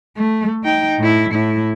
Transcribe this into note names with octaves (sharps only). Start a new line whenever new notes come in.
A3
D#4 G5
A2 E4
A2 E4